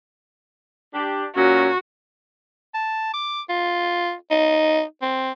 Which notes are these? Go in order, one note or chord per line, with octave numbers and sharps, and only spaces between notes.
D4 G4
A#2 F#3 C#4 F#4
A5
D6
F4
D#4
C4